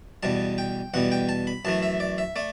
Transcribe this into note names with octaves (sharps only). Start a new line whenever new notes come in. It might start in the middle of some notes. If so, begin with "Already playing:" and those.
E2 B2 G3 A5
G5
E2 B2 G3 F#5
G5
A5
B5
F#2 E3 A3 A5
E5
D5
E5
A3 D5